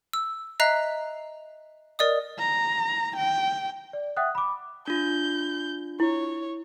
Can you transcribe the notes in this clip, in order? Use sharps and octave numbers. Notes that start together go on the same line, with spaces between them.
E6
D#5 E5 A#5 F#6 C7
A#4 D5 D#5 D#6
A#5
G5
D5
E5 F#5 G5 D#6 F#6
B5 D6
D4 F4 G6
E4 C#5